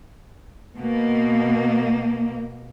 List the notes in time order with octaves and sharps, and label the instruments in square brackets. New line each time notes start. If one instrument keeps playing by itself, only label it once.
[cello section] B2 A#3